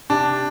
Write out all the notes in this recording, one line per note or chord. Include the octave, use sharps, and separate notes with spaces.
C3 D4